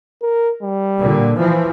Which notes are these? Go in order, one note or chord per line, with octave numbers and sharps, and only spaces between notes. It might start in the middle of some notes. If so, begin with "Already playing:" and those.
A#4
G3
A#2 D3
E3 F3